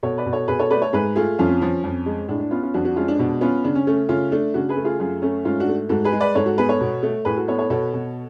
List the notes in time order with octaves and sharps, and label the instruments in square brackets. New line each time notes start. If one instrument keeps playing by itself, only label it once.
[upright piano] B2 A4 C#5
B4 D5
B2
A4 C#5
B2 G#4 B4
A4 C#5
A3 B4 D5
A4 C#5
G#2 G#4 B4
A3 F4 G#4
F2 C#4 F4
F3 C#4
F2
G#3
A2 D4
D4
B3 C#4 F4
C#4 F4
F2 D4 F#4
D4 F#4
G#3 C#4 F4
D4
B2 D4
B3 C#4 F4
C#3 D4
C#4
A3 C#4
C#3 C#4 F4
A3 D4
C#3 D4 F#4
G#4 B4
A3
F4 G#4
F#2 F4 G#4
A3 C#4
G#2 C#4 F4
D4 F#4
A3
G#2 F#4 A4
G#4 B4
G#3
B4 D5
G#2 A4 C#5
F#4 A4
B3 G#4 B4
A4 C#5
B2
A3
A2 G#4 B4
F#4 A4
B3 A4 C#5
A4 C#5
B2 A4 C#5
B2